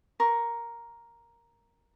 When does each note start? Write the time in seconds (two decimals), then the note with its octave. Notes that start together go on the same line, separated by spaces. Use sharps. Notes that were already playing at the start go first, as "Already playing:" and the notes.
0.20 A#4 C#6